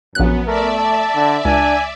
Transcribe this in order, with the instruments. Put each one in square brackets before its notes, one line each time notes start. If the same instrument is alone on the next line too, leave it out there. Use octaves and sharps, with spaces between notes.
[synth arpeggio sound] A#1 F#6 [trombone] F#2 [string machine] B3
[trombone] A3 [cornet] A#4 [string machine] D5 E5
[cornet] A5
[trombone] D3
[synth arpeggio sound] C#2 [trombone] D4 [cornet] G#5